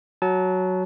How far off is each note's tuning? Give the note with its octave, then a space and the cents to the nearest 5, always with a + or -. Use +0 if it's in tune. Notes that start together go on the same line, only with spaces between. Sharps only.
F#3 +0 A5 -30